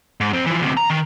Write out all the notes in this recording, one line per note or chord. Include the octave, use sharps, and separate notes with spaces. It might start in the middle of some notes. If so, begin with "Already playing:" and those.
G#2
F2 C4
E3 F3
D2 C3
A#5
D#3